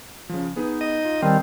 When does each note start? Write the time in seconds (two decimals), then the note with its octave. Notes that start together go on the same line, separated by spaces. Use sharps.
0.29 C#3 F3
0.56 B3 D#4 G#4 B4
0.81 D#5
1.05 F4
1.23 D#3 G3 C4 A5 F6